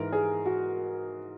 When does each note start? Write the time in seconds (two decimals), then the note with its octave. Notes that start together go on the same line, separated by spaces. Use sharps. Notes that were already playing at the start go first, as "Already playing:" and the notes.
Already playing: G#2 E3 A#4
0.12 G#4
0.45 F#4